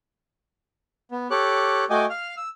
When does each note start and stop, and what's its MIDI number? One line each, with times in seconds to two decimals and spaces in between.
1.11 1.28 59
1.31 1.85 67
1.31 1.85 69
1.31 1.85 73
1.31 1.85 86
1.31 1.85 90
1.90 2.06 57
1.90 2.06 66
1.90 2.06 75
1.90 2.06 79
1.90 2.06 80
1.90 2.06 86
2.10 2.35 77
2.10 2.35 89
2.37 2.49 88